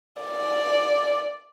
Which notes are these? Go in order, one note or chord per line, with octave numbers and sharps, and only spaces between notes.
D5